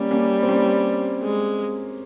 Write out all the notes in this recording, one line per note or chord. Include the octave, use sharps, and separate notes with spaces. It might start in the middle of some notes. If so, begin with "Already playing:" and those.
Already playing: G3 A#3 C#4
A#3 C#4
C4
A#3 C#4
G#3